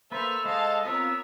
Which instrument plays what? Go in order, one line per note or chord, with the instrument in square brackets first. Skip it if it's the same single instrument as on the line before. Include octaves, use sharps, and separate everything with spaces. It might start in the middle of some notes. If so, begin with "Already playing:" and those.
[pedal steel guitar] A#3 B4 [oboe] A4 [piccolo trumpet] C5 [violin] E5 F6
[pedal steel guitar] G#3 C5 [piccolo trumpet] D#5 [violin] F5 A5
[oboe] B3 [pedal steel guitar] C4 F4 [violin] A#4 C#5 [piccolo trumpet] E6